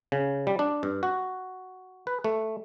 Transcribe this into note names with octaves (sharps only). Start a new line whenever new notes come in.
C#3
G3
D4
G2
F#4
B4
A3